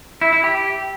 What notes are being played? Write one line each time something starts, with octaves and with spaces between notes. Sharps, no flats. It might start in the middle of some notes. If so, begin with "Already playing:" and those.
E4
E4
G4